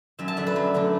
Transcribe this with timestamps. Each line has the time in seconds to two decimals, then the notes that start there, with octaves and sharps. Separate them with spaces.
0.19 F#2 E5
0.28 A5
0.37 D3 A3 D4 E5
0.47 B4
0.56 F#2
0.74 D3 A3 D4